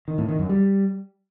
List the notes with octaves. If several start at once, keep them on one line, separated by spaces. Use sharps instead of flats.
D#3
A2
D#3
F#2
G3